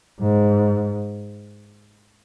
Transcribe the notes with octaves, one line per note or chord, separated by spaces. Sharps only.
G#2